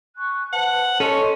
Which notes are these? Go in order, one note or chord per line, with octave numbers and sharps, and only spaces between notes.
G#5 C#6 F#6
B4 C5 F#5 A5
C#4 A4 D#5 C6 C#6